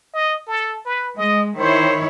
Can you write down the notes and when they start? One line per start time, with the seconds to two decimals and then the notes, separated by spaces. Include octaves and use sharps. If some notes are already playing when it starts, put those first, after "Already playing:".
0.14 D#5
0.47 A4
0.86 B4
1.17 G#3 D#5
1.57 D#3 E4 C5 C#5